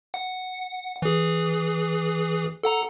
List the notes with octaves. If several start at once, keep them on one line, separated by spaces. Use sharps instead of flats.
F#5
E3 G#4
A4 F#5 A#5